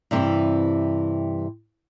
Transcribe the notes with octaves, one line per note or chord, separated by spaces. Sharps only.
G2 C3 E3 G3 C4